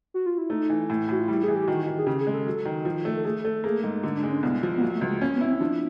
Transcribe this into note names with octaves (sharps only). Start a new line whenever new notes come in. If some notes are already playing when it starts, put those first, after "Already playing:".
F#4
F4
E4
A3 D#4
E3
A2
A2 F#4
F4
G3 E4
E3 G#4
G4
D#3 F#4
D#3
G#4
C#3 G4
G#4
G#3
A4
F#3
D#3
F3
A3
A4
A3 G#4
A3 A4
A#3 G#4
G#2
D3 D#4
D4
G#3
C#4
C2 B3
F3
B3
F#3 A#3
A3
C#2
G#3
A#3 C#4
B3
E4
C4
F3 D4